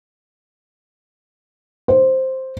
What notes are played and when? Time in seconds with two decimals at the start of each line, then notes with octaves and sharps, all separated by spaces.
1.88 C5